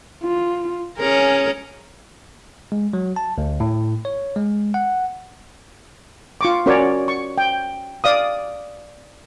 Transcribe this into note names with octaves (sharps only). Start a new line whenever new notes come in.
F4
C#4 G#4 A#4
G#3
F#3
A5
D2
A2
C#5
G#3
F#5
F4 C#6 D6
C#4 F#4 A#4 C#5 D5
C#6
G5
D5 F5 D#6